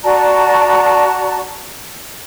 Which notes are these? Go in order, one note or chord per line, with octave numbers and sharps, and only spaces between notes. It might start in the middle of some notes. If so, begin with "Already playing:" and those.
F#4 D5 A5 A#5